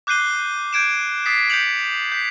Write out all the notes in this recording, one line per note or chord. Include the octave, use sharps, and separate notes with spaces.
D6 F#6 G6 C7 D#7 G7
G6 G#6 D7 E7
D#6 A6 B6 C7
G6 B6 C#7 F7 F#7
G6 B6